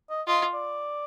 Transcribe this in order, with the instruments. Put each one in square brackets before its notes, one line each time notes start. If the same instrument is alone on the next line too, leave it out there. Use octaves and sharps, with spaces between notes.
[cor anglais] D#5
[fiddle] F4 [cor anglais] D#5
[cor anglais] D5